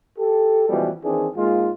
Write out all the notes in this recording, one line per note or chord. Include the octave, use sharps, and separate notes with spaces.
G4 A4
C#2 B2 E3 F3 G3
D#3 E3 C4 D4 G#4
G#2 G#3 A#3 F4